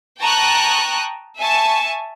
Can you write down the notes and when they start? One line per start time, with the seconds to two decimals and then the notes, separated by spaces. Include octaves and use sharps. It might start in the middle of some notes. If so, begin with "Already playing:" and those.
0.20 G5 A5 A#5 C#6 D#6 F#6
1.37 E5 G#5 A5 C#6